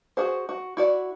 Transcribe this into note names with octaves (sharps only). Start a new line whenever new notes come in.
F#4 G#4 C5
F#4
E4 F#4 D5